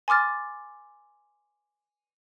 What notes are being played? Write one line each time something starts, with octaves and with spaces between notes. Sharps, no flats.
G#5 C6 D6 F6 A6